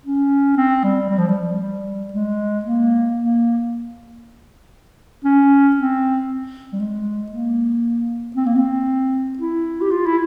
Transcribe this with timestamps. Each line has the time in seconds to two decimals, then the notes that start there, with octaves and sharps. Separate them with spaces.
0.06 C#4
0.57 C4
0.83 G3
1.09 G3
1.18 F3
1.29 G3
1.61 G3
2.13 G#3
2.65 A#3
3.17 A#3
5.24 C#4
5.76 C4
6.73 G3
6.80 G#3
7.32 A#3
8.36 C4
8.46 A#3
8.56 C4
9.38 E4
9.81 G4
9.91 F4
10.06 E4